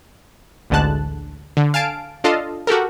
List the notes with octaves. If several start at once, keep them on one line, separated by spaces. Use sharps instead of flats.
A1 D2 D3 G#3 A5 F#6
D3
F5 G#5 A5 D7
D4 F4 A4 D#5 F5 A5
F#4 G4 A4 A#4